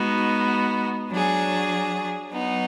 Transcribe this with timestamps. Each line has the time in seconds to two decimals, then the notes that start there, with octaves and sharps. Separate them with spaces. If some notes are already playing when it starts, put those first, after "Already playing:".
Already playing: G#3 B3 D#4 F#4
1.10 F#3 D4 G#4
2.31 F#3 B3 D#4